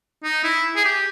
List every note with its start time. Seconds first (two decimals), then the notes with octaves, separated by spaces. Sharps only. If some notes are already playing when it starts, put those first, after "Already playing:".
0.24 D#4
0.44 E4
0.76 G#4
0.85 G4